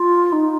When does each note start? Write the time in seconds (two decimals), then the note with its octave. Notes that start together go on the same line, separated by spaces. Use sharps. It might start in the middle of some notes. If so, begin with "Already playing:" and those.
Already playing: F4
0.32 D#4